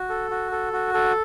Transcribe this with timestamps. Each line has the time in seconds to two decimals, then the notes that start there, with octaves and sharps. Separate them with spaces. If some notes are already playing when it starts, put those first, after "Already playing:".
Already playing: F#4
0.09 A4
0.31 F#4
0.51 A4
0.73 F#4
0.94 A4